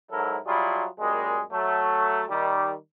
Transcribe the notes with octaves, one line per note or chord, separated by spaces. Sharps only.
G#2 F#3 E4 A4 A#4
F#3 G3 E4 F4 G#4
F#2 A#2 G3 G#3
F#3 A3
D#3 G3